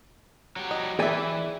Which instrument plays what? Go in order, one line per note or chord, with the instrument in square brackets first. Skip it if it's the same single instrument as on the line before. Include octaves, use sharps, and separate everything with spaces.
[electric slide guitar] F#3 G4
[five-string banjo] D#5
[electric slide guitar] E3 [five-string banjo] G4 E5 [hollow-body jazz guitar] G#4 D5 G#5